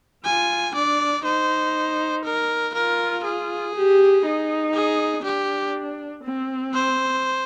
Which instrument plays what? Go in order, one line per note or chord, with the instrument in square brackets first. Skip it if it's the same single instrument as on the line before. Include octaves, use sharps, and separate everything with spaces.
[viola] F4 [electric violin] G#5
[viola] D4 [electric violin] D5
[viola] D#4 [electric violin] C5
[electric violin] A#4
[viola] F4 [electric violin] A#4
[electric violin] G#4
[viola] G4
D#4
[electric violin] G#4
[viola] D4 [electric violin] G4
[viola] C4
[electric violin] C5